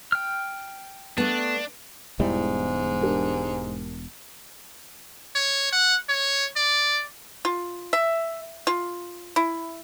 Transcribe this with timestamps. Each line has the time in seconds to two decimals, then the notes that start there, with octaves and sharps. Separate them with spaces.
0.12 G5 F6
1.18 A3 B3 D4
2.20 E1 E2 G#2 G3 E4
3.02 D4 G4 A#4
5.35 C#5
5.72 F#5
6.09 C#5
6.56 D5
7.45 F4
7.93 E5
8.67 F4
9.36 E4